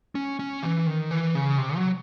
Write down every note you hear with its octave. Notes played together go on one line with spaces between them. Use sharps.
C#4
C#4
E3
D#3
E3
C#3
C3
F#3